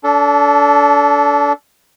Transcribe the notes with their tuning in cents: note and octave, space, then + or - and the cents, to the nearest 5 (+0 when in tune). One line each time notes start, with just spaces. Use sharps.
D4 -30 A4 +0